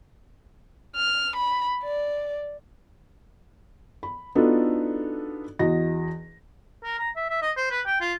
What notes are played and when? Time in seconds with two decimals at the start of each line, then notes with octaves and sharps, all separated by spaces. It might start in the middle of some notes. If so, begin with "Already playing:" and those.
0.96 F6
1.36 B5
1.84 D5
4.03 B5
4.35 B3 D4 D#4 F4 F#4 A4
5.59 E2 F#4 D#5 A#6
6.84 A#4
6.99 A#5
7.16 E5
7.30 E5
7.42 D#5
7.57 C5
7.71 B4
7.86 G5
8.01 F4